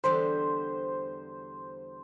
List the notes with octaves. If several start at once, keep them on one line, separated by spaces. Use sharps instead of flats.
E2 D3 G3 C5